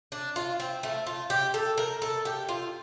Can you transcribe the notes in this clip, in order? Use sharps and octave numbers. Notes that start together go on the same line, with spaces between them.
D4
F4
C4
A3
F4
G4
A4
A#4
A4
G4
F4